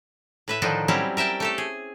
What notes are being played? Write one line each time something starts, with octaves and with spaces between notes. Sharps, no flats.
A2 B4 E5
A2 D3 D#3 F3 D4 D#4
F#3 G3 C4 C#4 E4 G4
A#4 E5 G5 A5
A3 G4 A4
G#4